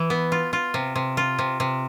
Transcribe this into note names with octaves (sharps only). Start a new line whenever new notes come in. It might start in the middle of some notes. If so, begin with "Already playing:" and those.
Already playing: E3
B3
F4
F4
C3
C3
F4
C3
C3